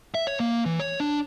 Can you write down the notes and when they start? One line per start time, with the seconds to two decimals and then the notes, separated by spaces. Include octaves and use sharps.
0.15 E5
0.27 C#5
0.40 A#3
0.65 E3
0.79 C#5
1.00 D4